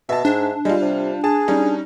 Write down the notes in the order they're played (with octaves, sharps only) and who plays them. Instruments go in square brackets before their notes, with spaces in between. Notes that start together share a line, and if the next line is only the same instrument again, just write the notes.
[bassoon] B2 [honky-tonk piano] E5 A5
[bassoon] G#2 [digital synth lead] D4
[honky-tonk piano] G3 F4 [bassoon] G#3
[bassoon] C3
[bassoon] G#4 [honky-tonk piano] A5
[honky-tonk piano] G3 C#4 D#4